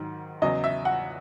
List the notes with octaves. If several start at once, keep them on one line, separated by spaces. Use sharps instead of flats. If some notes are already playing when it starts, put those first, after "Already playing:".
Already playing: G#2 D#3 F#3
E2 C#3 F#3 D#5
E5
F#5